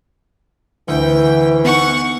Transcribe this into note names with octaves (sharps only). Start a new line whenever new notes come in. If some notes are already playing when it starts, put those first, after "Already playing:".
D2 E3 G5
B3 D#4 F#5 C#6